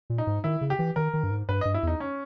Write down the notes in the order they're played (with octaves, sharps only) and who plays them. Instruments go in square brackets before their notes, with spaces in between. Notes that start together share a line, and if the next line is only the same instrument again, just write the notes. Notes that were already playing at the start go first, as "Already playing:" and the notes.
[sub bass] A#2
[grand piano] D#4
[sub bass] G#2
[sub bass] D#3 [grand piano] E4
[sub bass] C#3
[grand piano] G4
[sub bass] E3
[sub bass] D#3 [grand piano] A#4
[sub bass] D#3
G2
G#2
[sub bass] G2 [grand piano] B4
[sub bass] G2 [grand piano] D#5
[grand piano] E4
[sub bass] E2 [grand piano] D#4
[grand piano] C#4